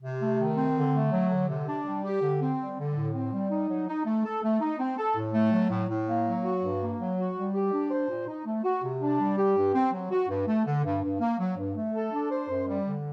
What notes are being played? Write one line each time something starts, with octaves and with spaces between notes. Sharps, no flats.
C3
A3
D#3
C4
D3
A3
F#3
D3
C3
D4
G3
G4
D3
C4
G3
D3
A2
C4
G3
D#4
F#3
D#4
A3
A4
A3
D#4
C4
A4
A2
A3
F#3
A2
A2
A#3
F#3
F#4
G2
A#3
F#3
F#4
G3
G4
D4
C5
A#2
D#4
A3
F#4
C3
D4
G3
G4
G2
C4
F#3
F#4
G2
A3
D3
G2
G2
A#3
F#3
G2
A3
A4
D4
C5
F#2
G3
D3